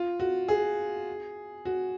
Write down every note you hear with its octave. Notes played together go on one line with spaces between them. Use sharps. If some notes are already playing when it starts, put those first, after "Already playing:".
Already playing: F4
F#4
G#4
F#4